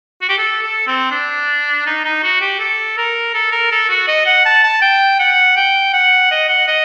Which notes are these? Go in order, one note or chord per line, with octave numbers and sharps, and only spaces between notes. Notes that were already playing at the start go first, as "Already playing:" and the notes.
F#4
G4
A4
A4
C4
D4
D#4
D#4
F#4
G4
A4
A#4
A4
A#4
A4
F#4
D#5
F#5
A5
A5
G5
F#5
G5
F#5
D#5
F#5
D#5